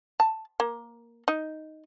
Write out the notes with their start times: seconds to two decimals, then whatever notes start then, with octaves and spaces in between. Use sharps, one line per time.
0.20 A5
0.60 A#3
1.28 D#4